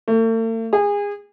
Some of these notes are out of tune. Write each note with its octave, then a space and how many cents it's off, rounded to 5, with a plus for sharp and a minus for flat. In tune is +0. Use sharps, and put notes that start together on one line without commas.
A3 +45
G#4 -30